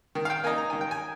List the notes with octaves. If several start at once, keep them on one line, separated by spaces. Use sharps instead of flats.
D#3
F5
G5
A#3 D#4 G#5
A#5
D#3 G#5
G5
G#5